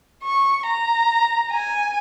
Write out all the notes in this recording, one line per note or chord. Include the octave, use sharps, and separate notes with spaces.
C#6
A#5
G#5